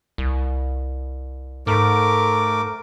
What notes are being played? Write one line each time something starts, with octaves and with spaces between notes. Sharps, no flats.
C2
G#2 A3 A#4 D6